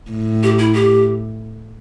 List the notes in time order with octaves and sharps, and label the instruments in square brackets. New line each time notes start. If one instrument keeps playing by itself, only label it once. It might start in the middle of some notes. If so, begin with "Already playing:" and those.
[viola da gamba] A2
[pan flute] G4
E4
G4